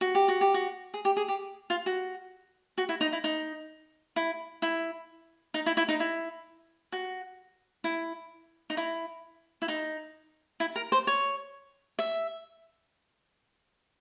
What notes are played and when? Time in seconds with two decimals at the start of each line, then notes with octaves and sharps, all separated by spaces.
0.01 F#4
0.15 G4
0.28 F#4
0.41 G4
0.54 F#4
0.94 G#4
1.05 G4
1.17 G#4
1.28 G4
1.70 F4
1.86 F#4
2.78 F#4
2.89 E4
3.01 D#4
3.12 E4
3.24 D#4
4.16 E4
4.62 E4
5.54 D#4
5.66 E4
5.77 E4
5.88 D#4
6.00 E4
6.92 F#4
7.84 E4
8.70 D#4
8.77 E4
9.62 E4
9.68 D#4
10.60 E4
10.76 A#4
10.92 C5
11.07 C#5
11.99 E5